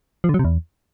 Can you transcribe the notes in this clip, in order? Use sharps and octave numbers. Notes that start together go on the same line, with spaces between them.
F3
D3
F#3
C3
E2